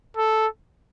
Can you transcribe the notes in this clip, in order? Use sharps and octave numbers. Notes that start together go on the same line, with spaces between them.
A4